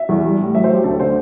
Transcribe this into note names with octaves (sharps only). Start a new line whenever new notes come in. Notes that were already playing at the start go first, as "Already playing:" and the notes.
Already playing: E5
E2
G3
A2
F#3 E5
C5
F#3
G4
D2 A4
D3 C5